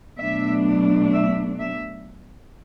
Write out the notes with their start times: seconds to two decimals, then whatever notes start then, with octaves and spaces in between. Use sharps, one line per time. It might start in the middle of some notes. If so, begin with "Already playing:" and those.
0.18 B2 F#3 A3 D4 E5
1.12 E5
1.59 E5